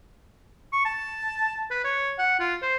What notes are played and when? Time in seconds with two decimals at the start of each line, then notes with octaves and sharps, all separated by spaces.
0.73 C#6
0.85 A5
1.71 B4
1.84 C#5
2.19 F#5
2.40 F4
2.62 C5